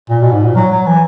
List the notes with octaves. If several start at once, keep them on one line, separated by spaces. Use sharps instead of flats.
A#2
B2
G#2
A#2
F#3
F#3
E3